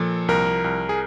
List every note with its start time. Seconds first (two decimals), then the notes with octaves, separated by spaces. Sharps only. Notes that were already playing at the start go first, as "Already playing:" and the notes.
Already playing: A#2 F3 A4
0.28 C2 A#4
0.64 C2
0.89 G#4